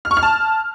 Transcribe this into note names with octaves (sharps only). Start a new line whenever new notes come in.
F6
C#6
F6
A5